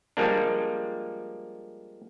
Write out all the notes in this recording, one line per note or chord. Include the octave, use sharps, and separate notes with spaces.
F3 G3 G#3 A#3 D4